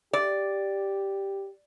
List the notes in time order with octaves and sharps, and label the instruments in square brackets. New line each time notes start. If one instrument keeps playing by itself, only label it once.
[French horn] G4 [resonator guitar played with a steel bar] D5